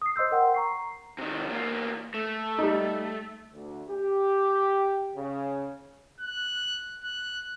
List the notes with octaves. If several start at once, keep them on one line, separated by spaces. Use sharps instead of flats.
D#6 C7
C5 D#5 C6 E6 G6
A#4 F#5 G5 C6
A#5 C#6 C7
C3 D#3
E2 A#3
A3
G3 D#4
D2
G4
C#3
F#6
F#6